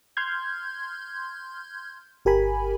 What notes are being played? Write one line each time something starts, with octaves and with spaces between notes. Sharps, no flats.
C6 F6 G6 G#6
G1 G4 A#4 G#5 B5